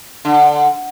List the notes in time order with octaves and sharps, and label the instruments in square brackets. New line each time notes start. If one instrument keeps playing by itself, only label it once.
[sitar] D3